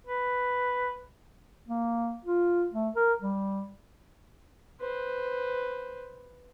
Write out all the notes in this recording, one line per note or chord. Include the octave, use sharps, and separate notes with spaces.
B4
A#3
F4
A3
A#4
G3
B4 C5